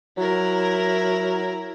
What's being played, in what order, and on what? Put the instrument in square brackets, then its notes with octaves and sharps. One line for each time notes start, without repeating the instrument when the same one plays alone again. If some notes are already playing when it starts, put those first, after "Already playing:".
[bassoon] F#3 [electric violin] E4 A#4